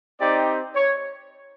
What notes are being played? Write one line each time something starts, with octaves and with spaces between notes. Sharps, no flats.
C4 D#4 G4 D5
C#5